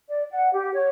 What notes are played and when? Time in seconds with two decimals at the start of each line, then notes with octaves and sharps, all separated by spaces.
0.09 D5
0.31 F#5
0.53 G4
0.74 C#5